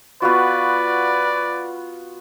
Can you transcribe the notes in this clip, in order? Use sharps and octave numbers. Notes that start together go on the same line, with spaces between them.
B3 F4 F#4 B4 D5